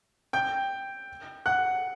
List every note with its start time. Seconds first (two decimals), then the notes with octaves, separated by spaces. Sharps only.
0.33 G5 G6
1.46 F#5 F#6